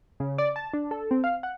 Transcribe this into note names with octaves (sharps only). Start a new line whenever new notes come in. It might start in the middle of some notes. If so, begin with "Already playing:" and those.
C#3
D5
A5
D4
A4
C4
F5
F#5